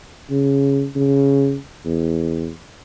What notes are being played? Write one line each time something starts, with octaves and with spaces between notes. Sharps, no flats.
C#3
C#3
E2